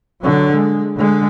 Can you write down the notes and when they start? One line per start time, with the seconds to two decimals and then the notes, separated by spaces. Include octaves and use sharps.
0.21 D3 F#3
0.53 G#3
0.97 D3 G#3